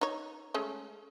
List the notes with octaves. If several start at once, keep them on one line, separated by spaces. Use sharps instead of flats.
D#4 C#5
G#3 A3 C#4